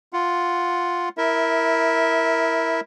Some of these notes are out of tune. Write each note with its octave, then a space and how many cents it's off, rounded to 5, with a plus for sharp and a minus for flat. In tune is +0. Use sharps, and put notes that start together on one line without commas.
F4 +0 F#5 +0
E4 +0 A#4 +0 E5 -20